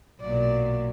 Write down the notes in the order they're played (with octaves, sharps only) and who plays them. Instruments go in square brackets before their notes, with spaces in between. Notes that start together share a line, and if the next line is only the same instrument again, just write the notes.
[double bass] B1 [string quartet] A#2 F#3 [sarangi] D5